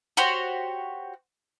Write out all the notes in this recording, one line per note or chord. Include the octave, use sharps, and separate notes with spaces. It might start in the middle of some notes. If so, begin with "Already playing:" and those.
F#4 G4 C5 C#5